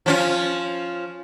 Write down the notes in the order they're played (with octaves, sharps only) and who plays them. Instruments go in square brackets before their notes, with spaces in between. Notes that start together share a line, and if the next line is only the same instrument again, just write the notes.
[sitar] F3 C#4 F4